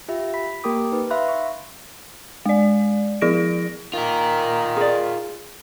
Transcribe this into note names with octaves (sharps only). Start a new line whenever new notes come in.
F4 G4 E5
B5 B6
A#3 G4 A#4 G5 D6 D#6
D#4 B4
E5 F5 B5 C6 F#6
C#6
G#3 D5
F3 E4 G#4 A#6 D7
D#3 F4 A#4
G#4 D5